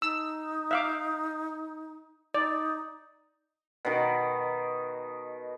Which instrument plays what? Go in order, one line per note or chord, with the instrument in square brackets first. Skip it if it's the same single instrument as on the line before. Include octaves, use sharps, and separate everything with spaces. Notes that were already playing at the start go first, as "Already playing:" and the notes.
[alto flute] D#4 [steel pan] E6
[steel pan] E5 F5 D6
[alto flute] D#4 [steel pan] D5
[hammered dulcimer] B2 D#3